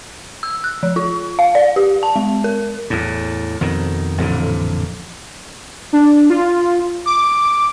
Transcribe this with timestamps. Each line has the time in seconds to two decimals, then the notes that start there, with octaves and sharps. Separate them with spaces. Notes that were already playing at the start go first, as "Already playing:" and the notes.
0.43 E6
0.64 F#6
0.83 F3
0.96 F4
1.39 F5
1.55 D5
1.76 G4
2.03 A5
2.16 G#3
2.44 A#4
2.90 E2 A2
3.61 F2 B2 D#3
4.18 A1 F2 A#2 D3
5.93 D4
6.30 F4
7.06 D6